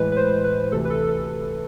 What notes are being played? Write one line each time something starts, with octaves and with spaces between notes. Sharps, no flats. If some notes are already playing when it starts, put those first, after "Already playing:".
Already playing: A2 E3 G#3 B4
B4
C5
B4
D2 C3 E3 A4
B4
A4
A4